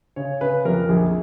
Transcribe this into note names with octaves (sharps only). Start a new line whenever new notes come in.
C#3 C#5
C#3 B4
F2 A#4
A#1 G#4